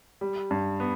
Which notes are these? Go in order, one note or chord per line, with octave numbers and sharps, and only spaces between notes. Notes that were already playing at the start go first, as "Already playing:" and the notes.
G3
G2
B3